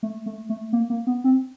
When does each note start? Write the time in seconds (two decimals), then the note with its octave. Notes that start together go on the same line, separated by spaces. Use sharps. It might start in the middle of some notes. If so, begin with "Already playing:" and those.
0.03 A3
0.26 A3
0.49 A3
0.73 A#3
0.90 A#3
1.07 B3
1.24 C4